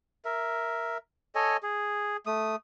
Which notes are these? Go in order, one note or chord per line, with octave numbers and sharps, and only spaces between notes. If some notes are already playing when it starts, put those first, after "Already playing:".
A#4 E5
A4 C#5 D#5 G#5
G#4
A3 D#6